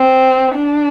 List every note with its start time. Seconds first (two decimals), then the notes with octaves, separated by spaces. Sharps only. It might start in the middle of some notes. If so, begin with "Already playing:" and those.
Already playing: C4
0.55 D4